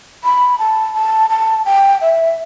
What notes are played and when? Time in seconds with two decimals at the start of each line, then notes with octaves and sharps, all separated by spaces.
0.24 B5
0.59 A5
0.94 A5
1.30 A5
1.66 G5
2.01 E5